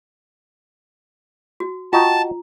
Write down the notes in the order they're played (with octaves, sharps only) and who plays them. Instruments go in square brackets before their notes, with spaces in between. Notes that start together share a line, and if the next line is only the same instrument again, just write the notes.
[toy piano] F#4
[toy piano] F4 A#5 [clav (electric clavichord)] F#4 D#5 G5 [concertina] A5